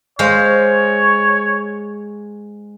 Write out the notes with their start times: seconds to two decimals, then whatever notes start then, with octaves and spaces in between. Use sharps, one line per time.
0.19 G#3 C5 C#5 F5